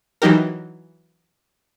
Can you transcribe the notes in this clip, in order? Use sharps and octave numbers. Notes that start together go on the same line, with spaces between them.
E3 F#3 D#4 G4 A#4